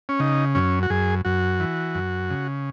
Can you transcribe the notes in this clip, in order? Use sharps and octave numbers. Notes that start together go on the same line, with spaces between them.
C#4
C#3 D#4
F#2 C#4
F#4
F#2 G#4
F#2 F#4
E3
F#2
C#3